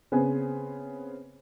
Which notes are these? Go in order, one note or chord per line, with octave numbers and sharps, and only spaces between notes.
C#3 B3 C4 B4 C5 G#5